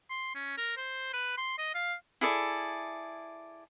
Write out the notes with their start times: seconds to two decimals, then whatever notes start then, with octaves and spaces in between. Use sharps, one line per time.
0.10 C6
0.35 C#4
0.57 A#4
0.77 C5
1.13 B4
1.38 C6
1.58 D#5
1.75 F5
2.21 E4 G#4 A4 D5